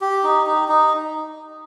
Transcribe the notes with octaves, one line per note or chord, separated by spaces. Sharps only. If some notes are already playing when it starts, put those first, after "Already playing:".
G4
D#4
D#4
D#4